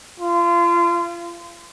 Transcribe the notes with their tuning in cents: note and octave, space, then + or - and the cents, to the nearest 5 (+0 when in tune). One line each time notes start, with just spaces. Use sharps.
F4 -30